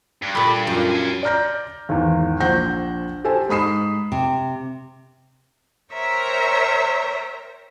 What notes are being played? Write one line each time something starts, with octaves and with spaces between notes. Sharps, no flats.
G2
A#2 A4 B5
F#2 F4
F5 G#5
D5 A#5 F6 G6 A#6
G#1 E2
A#1 C5 F#5 G6 A#6
G4 A4 C5 G#5
G#2 B5 D#6 C7 E7
C3
A#4 C5 C#5 E5 G5 A#5